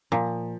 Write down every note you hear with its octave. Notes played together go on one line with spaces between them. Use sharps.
A#2 F3